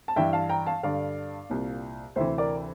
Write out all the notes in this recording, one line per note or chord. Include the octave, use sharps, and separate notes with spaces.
A5
G2 E3 E5 G5
F5 A5
G5 A#5
F5 A5
G2 D3 D5 F5
C2 A#2
D2 C3 E3 C5 E5
A#4 D5